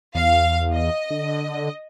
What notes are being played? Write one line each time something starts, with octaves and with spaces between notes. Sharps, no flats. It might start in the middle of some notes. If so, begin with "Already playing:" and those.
E2 F5
D#5
D3